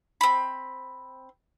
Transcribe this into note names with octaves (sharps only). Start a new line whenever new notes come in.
C4 B5